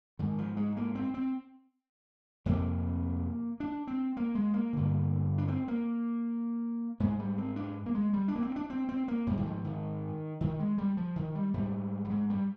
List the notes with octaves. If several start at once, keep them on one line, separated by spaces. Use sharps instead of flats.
G#2 D#3
F3
G#3
A#3
C4
C4
F2 C3 A#3
D4
C4
A#3
G#3
A#3
G2 D3
D4
C4
A#3
G#2 G#3
G3
C4
D4
A#3
G#3
G3
D4
A#3
C4
D4
C4
C4
A#3
G#2 G3
D#3
F3
D#3
D#3
G#3
G3
F3
D#3
G3
G#2 G3
G3
G#3
G3